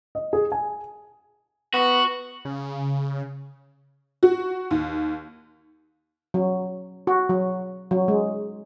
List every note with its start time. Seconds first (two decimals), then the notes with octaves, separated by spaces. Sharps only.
0.15 D#5
0.33 G#4
0.52 G#5
1.74 B3 F#4
2.45 C#3
4.23 F#4
4.71 D#2
6.34 F#3
7.07 F#4
7.29 F#3
7.91 F#3
8.08 G#3